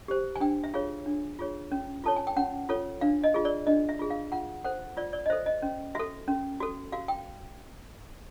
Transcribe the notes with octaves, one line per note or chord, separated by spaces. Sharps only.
G4 C5
G#5
D4 G5
E5
F4 G#4 C#5 F5
D4
F4 G#4 C#5
C#4
F4 A4 C#5 A5
G#5
G5
C#4 F#5
F4 A4 C#5
D4 F5
D#5
F4 G#4
D5
D4 D#5
E5
F4 G#4
F5
F4 F#5
A4 C5 F#5
F4 D5
D5
D#5
A4 C5 E5
D#5
C#4
F#4 A4 E5
C#4
F#4 A4
F#4 F5
G5